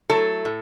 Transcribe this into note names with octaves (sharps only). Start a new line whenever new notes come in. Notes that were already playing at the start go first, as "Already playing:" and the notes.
F#3 A3 E4 A4
A2